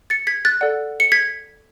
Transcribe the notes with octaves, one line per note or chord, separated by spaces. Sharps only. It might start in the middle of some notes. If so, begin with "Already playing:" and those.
A6 C#7
G#6 B6
F#6 A6
A4 D5 F#5
C#7
G#6 B6